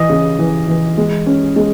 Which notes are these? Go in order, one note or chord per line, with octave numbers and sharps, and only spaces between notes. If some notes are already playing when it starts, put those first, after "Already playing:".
Already playing: E3 D#5
C#3
E3
E3
G#3
C#4
G#3